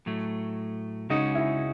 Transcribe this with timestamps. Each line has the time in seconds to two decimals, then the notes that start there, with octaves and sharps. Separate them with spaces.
0.06 A2 F#3 A3
1.10 C#2 C#3 G#3 C#4 D#4 F#4
1.35 E4